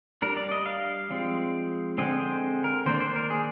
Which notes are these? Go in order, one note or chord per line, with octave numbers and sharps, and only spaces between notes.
G3 D4 A#4
D5
D#5
F5
F3 G#3 C4
D3 G#3 C4 D#5
C5
A#4
D#3 A#3 D4 C5
C5
A#4
G#4